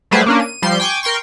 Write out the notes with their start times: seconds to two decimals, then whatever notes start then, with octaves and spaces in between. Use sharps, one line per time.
0.11 F#3 G3 A3 G#4 B4 C5
0.26 A#3 C#4 D4
0.40 D#7
0.62 F3 G3 C6 G6
0.80 G5 G#5 C#6 D6
1.03 A#4 G5 C6 C#6